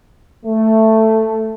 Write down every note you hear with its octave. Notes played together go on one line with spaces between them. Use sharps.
A3